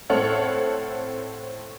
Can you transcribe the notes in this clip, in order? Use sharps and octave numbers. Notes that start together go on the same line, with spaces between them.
A2 C4 A4 C#5 F#5 F6